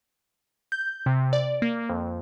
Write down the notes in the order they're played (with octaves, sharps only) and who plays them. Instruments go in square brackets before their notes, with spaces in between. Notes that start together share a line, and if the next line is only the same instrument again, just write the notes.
[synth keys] G6
C3
D5
A#3
F2